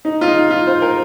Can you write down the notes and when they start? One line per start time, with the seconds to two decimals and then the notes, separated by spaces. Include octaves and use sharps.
0.05 D#4
0.21 F4
0.28 D#4
0.51 F4
0.67 C5
0.82 A#4